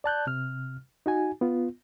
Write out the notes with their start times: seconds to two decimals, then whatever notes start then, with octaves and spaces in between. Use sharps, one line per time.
0.04 D5 A5 F#6 G6
0.27 C3 F6
1.06 D#4 F#4 G#5
1.41 B3 F4